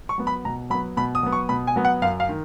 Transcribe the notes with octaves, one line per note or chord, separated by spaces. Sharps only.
C#6
F#3 B3
B5
B2 A#5
F#3 B3 B5
B2 B5
D#6
F#3 B3
C#6
B2 B5
G#5
F#3 B3
F#5
F#2 F5
F5
D#3